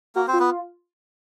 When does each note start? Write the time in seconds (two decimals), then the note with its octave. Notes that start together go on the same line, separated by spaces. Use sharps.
0.16 A#3 F#4 A#4
0.28 C4 C5
0.33 F4
0.39 B3 B4